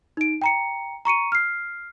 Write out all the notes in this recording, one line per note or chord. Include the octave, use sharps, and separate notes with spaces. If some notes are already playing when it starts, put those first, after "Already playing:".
D#4 D7
G5 A#5 C#7
A#5 C#6 C#7 D#7
F6 C7